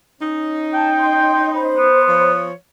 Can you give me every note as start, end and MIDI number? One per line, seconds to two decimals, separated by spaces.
0.21 1.89 61
0.21 1.89 63
0.74 1.65 79
0.74 0.89 81
0.99 1.52 84
0.99 1.52 91
1.54 2.30 72
1.54 2.30 83
1.77 2.45 59
2.08 2.53 53
2.08 2.53 73